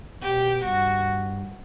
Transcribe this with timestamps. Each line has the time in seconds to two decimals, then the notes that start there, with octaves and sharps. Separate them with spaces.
0.22 B2 G4
0.64 G2 F#4